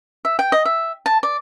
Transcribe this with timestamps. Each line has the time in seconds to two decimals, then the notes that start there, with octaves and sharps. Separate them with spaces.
0.25 E5
0.39 G5
0.52 D#5
0.65 E5
1.06 A5
1.23 D5